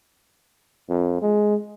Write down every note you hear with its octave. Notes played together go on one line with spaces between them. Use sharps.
F2
G#3